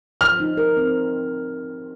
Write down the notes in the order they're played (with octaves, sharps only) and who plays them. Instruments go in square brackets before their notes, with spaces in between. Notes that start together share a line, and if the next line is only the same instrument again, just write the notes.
[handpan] F3 [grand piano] F6
[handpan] D#4
A#4
C4